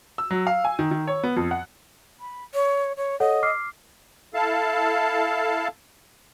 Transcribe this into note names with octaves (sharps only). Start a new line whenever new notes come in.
E6
F#3
F5
G#5
D#3
D#3
C#5
B3
F2
F#5
B5
C#5
C#5
A4 C#5 D#5 F#5
D6 F6 C7
E4 A4 F5 A5